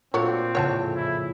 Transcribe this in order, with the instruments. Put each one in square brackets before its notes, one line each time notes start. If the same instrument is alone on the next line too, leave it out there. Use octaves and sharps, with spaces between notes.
[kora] A#2 D4 [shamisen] F#3 A3 C#5 [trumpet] C4
[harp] F2 A2 C#3 [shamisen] C#5 F#5 A5
[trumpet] E4